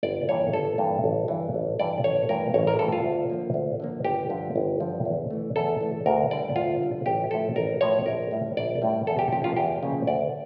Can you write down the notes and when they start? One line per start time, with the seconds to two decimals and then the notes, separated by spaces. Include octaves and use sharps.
0.03 G1 D5
0.28 G2 E3 A#3 C#5
0.53 G1 A4
0.78 G2 E3 A#3
1.04 A1
1.28 G2 E3
1.54 A1
1.79 G2 E3 D5
2.04 A1 C#5
2.29 G2 E3 A3 A#4
2.54 A1 C#5
2.67 A#4
2.79 G2 E3 A3 A4
2.92 F4
3.04 D2
3.30 D3 F3 A#3
3.54 D2
3.80 D3 F3 A#3
4.05 G1 G4
4.29 G2 D3 F3
4.56 G1
4.80 G2 D3 F3
5.05 E2
5.30 E3 A3
5.56 E2 A4
5.81 E3 A3
6.06 D2 A#4
6.31 D3 G3 D5
6.56 D2 F4
6.81 D3 G3
7.06 A1 G4
7.31 A2 F3 A4
7.56 A1 A#4
7.81 A2 F3 C#5
8.06 A#1 A#4
8.31 A2 G3
8.57 A#1 D5
8.82 A2 G3
9.07 E2 A4
9.19 G4
9.32 C#3 F3 A#3 G4
9.44 F4
9.57 E2 G4
9.83 C#3 F3 A#3
10.07 D2 D5